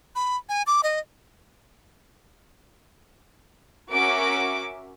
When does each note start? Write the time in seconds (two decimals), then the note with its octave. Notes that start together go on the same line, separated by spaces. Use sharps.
0.15 B5
0.49 G#5
0.67 D6
0.83 D#5
3.91 C#4 F#4 A#4 E5 D6 D7